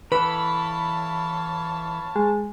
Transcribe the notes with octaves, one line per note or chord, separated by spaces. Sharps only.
E3 A4 B4 C#5 F5 A5 B5
G#3